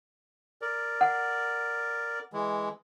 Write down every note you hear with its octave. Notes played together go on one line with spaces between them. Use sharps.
A#4 D5
F#5
E3 G#3